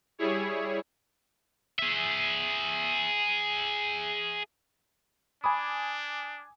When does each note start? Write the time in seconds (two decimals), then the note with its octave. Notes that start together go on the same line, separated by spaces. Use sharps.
0.18 G3 E4 G#4 C#5
1.79 G#4 E5
5.44 D4 G#5 B5 D6 D#6